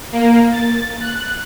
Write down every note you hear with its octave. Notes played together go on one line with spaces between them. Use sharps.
A#3
A6
F#6